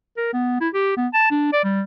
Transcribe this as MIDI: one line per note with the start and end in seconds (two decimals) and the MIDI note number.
0.17 0.33 70
0.33 0.59 59
0.61 0.69 64
0.74 0.95 67
0.97 1.07 59
1.14 1.28 81
1.31 1.49 62
1.53 1.61 74
1.64 1.82 55